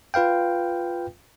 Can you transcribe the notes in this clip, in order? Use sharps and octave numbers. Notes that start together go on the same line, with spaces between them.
F4 B4 F5 G5